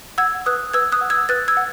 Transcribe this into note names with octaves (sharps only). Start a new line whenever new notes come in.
F#5 E6 G#6
B4 D#6 F#6
B4 E6 G#6
D#6 F#6
F#5
E6 G#6
B4 F#6 A6
E6 G#6
F#5